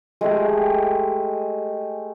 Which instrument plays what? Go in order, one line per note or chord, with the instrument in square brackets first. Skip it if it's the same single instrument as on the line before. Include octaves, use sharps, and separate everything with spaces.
[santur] G#3 A3 G4